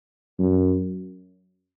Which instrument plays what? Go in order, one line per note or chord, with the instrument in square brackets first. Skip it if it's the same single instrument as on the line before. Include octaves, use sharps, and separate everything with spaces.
[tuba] F#2